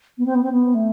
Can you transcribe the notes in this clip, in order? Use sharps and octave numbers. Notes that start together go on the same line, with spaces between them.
B3
C4
B3
C4
B3
A3